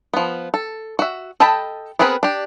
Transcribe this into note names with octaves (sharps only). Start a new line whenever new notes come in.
F3 B3
A4
F#4 E5
A4 D#5 G5 A5 B5
B3 C4 G#4 A#4 B4
D4 G4